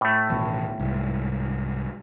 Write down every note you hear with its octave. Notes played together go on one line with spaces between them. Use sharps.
A2 A3
A1 D#2 B2
C2 G#2